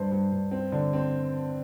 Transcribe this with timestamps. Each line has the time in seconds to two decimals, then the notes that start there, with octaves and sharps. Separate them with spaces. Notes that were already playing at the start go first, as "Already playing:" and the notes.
Already playing: G2 C5
0.11 G2
0.32 G2
0.51 C4
0.72 D3
0.93 C4